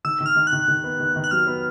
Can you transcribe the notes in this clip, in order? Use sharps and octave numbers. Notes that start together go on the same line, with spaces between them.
D#3 E6
D#3
F6
D#3
F#6
D#3
D#3
B3
D#3
D#3
F#6
F#3 F6
B3